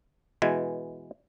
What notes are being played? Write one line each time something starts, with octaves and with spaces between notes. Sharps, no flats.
B2 E3 G#3 G#5